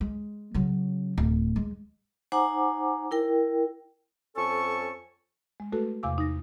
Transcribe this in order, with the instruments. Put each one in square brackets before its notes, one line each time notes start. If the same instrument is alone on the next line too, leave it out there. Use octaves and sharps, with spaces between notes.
[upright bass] G#3
C#3 F#3
D1
G#3
[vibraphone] D#4 C5 F#5 G#5 A#5 D6
E4 A#4 G5
[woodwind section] F2 C#4 A4 G#5 A5 C#6
[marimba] G#3
A3 F#4 A4 B4
E2 C3 F5 G#5 D6 E6
D#4 A#6